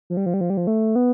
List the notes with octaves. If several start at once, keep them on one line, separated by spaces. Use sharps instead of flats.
F3
G3
F3
G3
F3
G3
F3
A3
B3